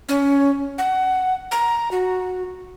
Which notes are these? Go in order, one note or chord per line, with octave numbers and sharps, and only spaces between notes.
C#4
F#5
A#5
F#4